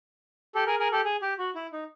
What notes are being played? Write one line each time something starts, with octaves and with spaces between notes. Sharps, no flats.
G4 A4
G#4 A#4
G#4 A#4
G4 A4
G#4
G4
F#4
E4
D#4